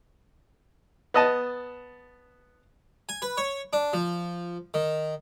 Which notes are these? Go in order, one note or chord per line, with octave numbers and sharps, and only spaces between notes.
B3 D#5 A5
G#5
B4
C#5
D4
F3
D#3